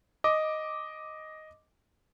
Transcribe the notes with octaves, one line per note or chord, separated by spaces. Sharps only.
D#5 D6